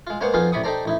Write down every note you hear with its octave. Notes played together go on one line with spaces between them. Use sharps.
G#3 F4
G#3 A#3 B3 C5 C#5 F#5
F2 B3 D#4 F4 G#4 F5
A1 C3 D5 B5 C#6 D#6
D#4 G4 A4 C5 D5 A#5
A1 D#4 E4